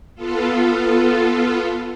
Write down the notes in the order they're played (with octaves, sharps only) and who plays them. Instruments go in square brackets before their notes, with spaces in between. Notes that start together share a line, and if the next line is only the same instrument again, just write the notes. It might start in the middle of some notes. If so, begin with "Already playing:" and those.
[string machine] B3 F4 A4